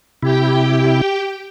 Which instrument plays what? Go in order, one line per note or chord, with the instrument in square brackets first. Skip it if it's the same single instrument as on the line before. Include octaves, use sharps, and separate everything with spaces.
[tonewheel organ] C3 E4 [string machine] G4 G5